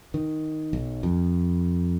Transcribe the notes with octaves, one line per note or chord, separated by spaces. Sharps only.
D#3
B1
F2